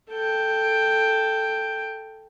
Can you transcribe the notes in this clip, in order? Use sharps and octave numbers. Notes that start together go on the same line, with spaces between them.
A4 G5